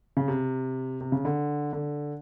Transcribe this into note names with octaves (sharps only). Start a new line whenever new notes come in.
C#3
C3
C3
C#3
D3
D3